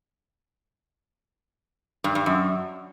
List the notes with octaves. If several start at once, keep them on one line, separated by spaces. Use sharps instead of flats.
G2
G2
F#2